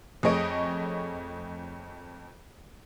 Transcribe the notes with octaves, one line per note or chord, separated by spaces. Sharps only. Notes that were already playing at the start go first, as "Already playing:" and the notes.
F2 A3 G#4 C#5 D#5 D7